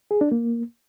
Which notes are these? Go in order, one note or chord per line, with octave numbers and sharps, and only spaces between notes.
G#4
D4
A#3